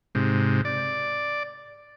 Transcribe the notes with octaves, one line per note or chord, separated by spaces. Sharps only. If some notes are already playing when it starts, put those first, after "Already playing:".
G#2 C3
D5